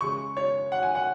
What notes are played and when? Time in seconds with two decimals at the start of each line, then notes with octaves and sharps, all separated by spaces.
0.01 C#3 G#3 C#6
0.37 C#5
0.72 F#5
0.83 G#5
0.95 F#5